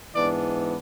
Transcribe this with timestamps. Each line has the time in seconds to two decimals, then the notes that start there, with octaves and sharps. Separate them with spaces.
0.15 G#2 E3 B3 D4 D5